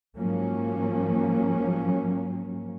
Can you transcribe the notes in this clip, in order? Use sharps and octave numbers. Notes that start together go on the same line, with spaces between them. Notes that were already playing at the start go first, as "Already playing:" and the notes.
G#2 F3 F#3 A#3 C#4